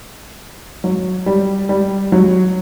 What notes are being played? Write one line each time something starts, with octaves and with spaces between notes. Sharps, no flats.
F#3
G3
G3
F#3